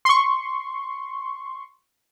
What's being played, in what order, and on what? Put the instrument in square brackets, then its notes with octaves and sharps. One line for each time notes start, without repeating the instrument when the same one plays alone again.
[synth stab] C6 C#6